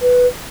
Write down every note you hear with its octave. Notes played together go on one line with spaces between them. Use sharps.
B4